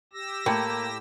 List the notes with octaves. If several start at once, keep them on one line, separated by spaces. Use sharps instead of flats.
G4 E6 A#6
A2 A#3 G5